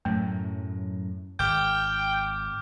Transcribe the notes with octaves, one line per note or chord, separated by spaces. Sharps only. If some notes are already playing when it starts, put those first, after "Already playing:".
F#2 A2 F#3 A3
G#1 G5 D6 F6 G6